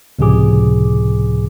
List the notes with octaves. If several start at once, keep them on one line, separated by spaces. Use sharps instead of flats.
C#2 A2 C3 F3 G#4 D6